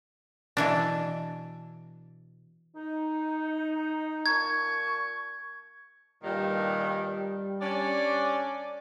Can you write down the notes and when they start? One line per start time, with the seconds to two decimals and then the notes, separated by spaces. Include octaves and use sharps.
0.57 B2 E3 D4
2.74 D#4
4.26 A#2 A5 C#6 G#6
6.23 G2 A#2 D#3 G3
7.61 C#4 D4 D5